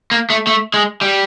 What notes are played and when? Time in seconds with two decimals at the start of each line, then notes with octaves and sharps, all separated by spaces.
0.11 A#3
0.30 A3
0.47 A3
0.74 G#3
1.01 G3